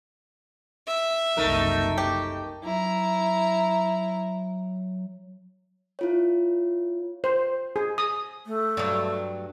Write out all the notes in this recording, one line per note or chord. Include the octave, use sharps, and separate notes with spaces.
E5
F#1 C2 A3 D#4 A#4
G4
F#3 E4 A#5
E4 F4 C#5
C5
G#4
D#6
A3
G2 F#3